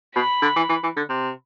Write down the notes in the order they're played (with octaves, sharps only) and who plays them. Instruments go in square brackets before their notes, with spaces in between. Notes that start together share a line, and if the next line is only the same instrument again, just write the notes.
[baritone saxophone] B2 [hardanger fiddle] B5
[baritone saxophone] D3
E3
E3
E3
D3
C3